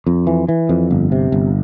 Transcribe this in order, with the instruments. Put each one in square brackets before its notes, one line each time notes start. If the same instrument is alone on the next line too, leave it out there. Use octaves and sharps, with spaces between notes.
[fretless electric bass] F2
E3
E3
F2
G1
C3
G1